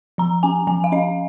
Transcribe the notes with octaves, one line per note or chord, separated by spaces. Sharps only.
F3 A#5
C#4 G#5
F3 G#5
F5
C#4 D#5